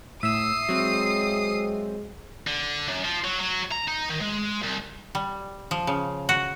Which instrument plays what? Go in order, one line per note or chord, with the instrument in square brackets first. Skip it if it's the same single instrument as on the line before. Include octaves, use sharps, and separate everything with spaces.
[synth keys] A2 [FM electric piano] E5 E6 [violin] D#6 C7
[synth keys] F#3 C4 [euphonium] G#3
[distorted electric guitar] D3
F#2
F3
F#3
F#3
A#5
D#4
D#3
G#3
C2
[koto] G3
F3
C#3
F#4